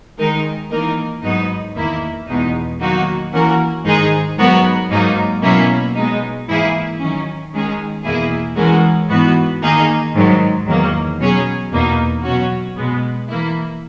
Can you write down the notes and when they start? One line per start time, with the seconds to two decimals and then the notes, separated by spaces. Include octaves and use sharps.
0.18 D#3 G#3 D#4 A#4
0.71 E3 A#3 D#4 A#4
1.23 G#2 F#3 B3 D#4
1.75 E2 D#3 A#3 E4
2.28 E2 B2 G#3 D#4
2.81 D#3 F#3 A#3 D#4 F#4
3.32 E3 A#3 C#4 F#4 A#4
3.85 G#2 D#3 G#3 D#4 G#4
4.37 G#2 F#3 B3 F#4 A#4
4.90 G#2 F#3 A#3 D#4
5.42 B2 F#3 A#3 C#4 E4
5.95 B2 G#3 D#4
6.47 G#2 E3 A#3 E4 G#4
6.99 D#3 F#3 C#4
7.53 D#3 G#3 C#4 G#4
8.04 E2 B2 A#3 E4 G#4
8.57 E3 G#3 C#4 F#4 A#4
9.09 G#2 E3 B3 F#4
9.62 D#3 A#3 D#4 G#4
10.14 G#2 D#3 F#3
10.67 E2 D#3 F#3 A#3
11.20 B2 F#3 C#4 G#4
11.71 E2 B2 A#3 D#4
12.24 B2 F#3 C#4 F#4
12.76 B2 G#3 B3
13.29 E3 A#3 E4